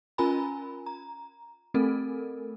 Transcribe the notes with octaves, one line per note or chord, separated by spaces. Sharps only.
C#4 F4 A#4 G#5 A#5 B5
A#5
A3 C4 A4 A#4